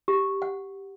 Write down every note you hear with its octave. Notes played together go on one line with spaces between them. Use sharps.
G4
F#5